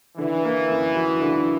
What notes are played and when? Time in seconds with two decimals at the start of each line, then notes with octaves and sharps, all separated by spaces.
0.18 D3 E3
0.44 A#3
0.70 F#2
0.95 F#3
1.22 D3